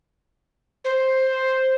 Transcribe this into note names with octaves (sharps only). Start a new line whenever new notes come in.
C5